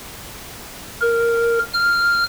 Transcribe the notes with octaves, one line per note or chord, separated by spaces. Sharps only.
A#4
F6